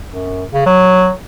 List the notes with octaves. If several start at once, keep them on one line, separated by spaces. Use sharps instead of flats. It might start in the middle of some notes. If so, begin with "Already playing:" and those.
F#2
C#3
F#3